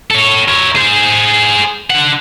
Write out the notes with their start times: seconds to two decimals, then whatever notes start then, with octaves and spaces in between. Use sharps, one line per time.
0.11 A4 C#5
0.48 A#4 C#5
0.75 G#4 C5
1.90 D4 F#5